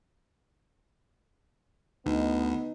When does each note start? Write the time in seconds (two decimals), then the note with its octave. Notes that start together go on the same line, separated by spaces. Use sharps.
2.06 D2 B3 D#4